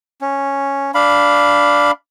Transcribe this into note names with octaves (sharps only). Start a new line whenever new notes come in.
C#4
D4 F5 B5